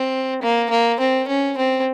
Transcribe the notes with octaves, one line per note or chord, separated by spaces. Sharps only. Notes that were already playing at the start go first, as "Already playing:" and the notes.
Already playing: C4
A#3
A#3
C4
C#4
C4